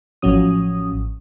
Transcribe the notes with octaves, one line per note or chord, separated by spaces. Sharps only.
A1 A2 F3 F#3 C#4 D#6